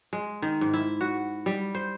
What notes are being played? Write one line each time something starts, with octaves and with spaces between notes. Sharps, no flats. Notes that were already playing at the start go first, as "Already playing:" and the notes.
G#3
D#3
G#2
E4
F#4
G3
C5